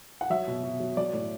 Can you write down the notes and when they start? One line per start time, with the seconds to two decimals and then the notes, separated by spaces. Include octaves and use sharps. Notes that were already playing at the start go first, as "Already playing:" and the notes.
0.21 F#5
0.30 F#3 E5
0.47 B2
0.63 B2
0.80 F#3
0.97 F#3 D5
1.13 A2